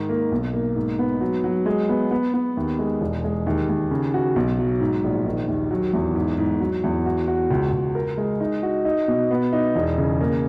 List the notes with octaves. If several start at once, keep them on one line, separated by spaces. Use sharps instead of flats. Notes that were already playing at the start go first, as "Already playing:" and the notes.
Already playing: G#2 D#3
A#3
B1
A#3
G#2
B3
F#3
F#3
G#3
B3
B3
B3
D#2
G#3
E1
G#3
D#2
D#2
C#3
F#4
B1
F#3
G#2
A#1
D#3
D#2
F#3
E2
G#2
G#2
F#3
E2
F#4
F#4
C#2
C#2
A#4
G#3
D#4
F#4
D#4
B2
B3
D#4
E1
C#3
A#3